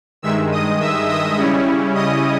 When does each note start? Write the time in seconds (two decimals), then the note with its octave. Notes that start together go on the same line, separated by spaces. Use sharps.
0.22 G2 D#3 G#3 E5 E6
0.52 D#5 D#6
0.80 E5 E6
1.09 D#5 D#6
1.37 C#3 G3 C#4 E4
1.94 D#5 D#6